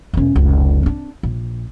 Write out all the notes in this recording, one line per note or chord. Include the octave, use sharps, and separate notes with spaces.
E1 C#4
F1 C#2
C4 D4
A#1